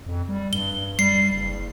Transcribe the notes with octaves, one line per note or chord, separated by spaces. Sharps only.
F2
G3
G2 G7
G3 C7
F#1